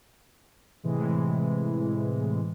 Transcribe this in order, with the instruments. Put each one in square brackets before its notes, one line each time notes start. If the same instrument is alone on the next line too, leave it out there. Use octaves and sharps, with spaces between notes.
[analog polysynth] A2 C3 E3 G#3